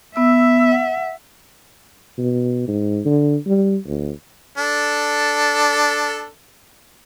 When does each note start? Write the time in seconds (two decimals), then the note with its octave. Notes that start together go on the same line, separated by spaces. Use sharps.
0.16 B3 E5 E6
0.72 F#5
2.18 B2
2.68 G#2
3.05 D3
3.47 G3
3.86 D2
4.57 D4 A4